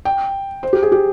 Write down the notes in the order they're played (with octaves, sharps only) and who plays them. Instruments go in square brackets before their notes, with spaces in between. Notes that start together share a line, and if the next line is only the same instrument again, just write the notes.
[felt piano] G5
C5
G4
G#4
G4